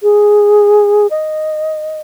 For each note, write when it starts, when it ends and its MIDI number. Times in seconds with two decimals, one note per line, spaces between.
0.03 1.07 68
1.10 2.01 75